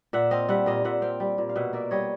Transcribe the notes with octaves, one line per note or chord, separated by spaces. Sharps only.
A#2 E5 F#5
C4 D#5 F5
G3 E5 F#5
A#2 D#5 F5
A#2 E5 F#5
C4 F5 G5
G3
A#2
F5
B2 E5 F#5
A#3 D5 E5
G3 C#5 D#5